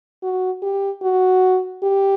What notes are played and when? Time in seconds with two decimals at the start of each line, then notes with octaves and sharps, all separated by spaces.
0.23 F#4
0.62 G4
1.03 F#4
1.83 G4